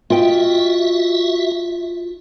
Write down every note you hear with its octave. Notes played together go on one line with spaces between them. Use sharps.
F4 F#4 D#5 E5 G5